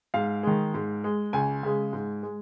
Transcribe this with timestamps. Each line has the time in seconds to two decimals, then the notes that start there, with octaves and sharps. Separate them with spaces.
0.14 G#2 F5
0.43 D#3 G#3
0.74 G#2
1.04 G#3
1.33 C#2 G#5
1.63 C#3 G#3
1.93 G#2
2.23 G#3